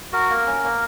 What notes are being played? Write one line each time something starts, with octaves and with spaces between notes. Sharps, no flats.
F#4 A#4
A#3
C#4
A#3